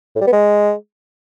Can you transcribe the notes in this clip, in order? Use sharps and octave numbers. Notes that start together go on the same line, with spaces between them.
A2
G3
B3
G#3